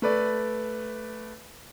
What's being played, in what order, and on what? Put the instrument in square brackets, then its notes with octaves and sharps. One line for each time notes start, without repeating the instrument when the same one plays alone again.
[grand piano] A3 B4 D5